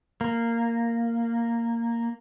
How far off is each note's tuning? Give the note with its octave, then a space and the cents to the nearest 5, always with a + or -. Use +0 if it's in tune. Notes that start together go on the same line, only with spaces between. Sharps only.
A#3 -5